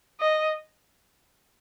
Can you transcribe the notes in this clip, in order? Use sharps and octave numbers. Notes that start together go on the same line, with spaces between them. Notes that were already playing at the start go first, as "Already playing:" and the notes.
D#5